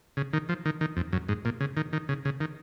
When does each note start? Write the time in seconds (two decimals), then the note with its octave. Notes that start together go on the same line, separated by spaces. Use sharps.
0.17 C#3
0.33 D#3
0.49 F3
0.66 D#3
0.81 D#3
0.97 F2
1.13 F#2
1.29 G#2
1.45 A#2
1.61 C#3
1.77 D#3
1.93 D#3
2.09 C#3
2.25 C#3
2.40 D#3